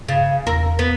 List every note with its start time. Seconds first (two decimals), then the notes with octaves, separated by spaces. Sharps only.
0.08 G2 C#3 A6
0.47 E2 A#4 E6 A#6
0.79 B3